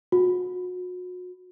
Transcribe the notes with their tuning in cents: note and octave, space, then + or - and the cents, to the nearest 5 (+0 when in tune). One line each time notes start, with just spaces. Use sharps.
F#4 -35